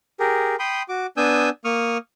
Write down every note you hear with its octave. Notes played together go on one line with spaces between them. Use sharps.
G4 G#4 A#4
G5 B5 C6 D#6
F#4 D6
B3 D4 G#5 D#6 E6 G6
A#3 C#6 D#6 F6